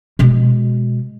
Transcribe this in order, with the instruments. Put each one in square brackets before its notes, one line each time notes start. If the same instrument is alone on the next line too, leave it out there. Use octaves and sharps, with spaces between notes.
[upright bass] B2 G#3